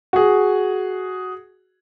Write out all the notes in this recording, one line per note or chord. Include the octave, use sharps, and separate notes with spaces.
F#4 G#4